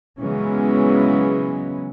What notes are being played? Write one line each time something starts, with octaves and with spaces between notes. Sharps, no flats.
C#3 E3 F#3 G#3 B3 C#4